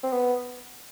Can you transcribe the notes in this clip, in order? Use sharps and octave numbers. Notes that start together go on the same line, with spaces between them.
C4
B3